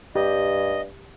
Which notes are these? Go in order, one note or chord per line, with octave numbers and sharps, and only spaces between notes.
G2 G4 D#5